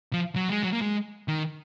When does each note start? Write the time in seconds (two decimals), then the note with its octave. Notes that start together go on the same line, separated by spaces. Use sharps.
0.13 F3
0.36 F#3
0.49 G#3
0.63 F#3
0.73 A#3
0.81 G#3
1.28 D#3